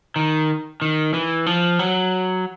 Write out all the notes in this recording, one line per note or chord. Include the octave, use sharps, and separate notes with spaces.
D#3
D#3
E3
F3
F#3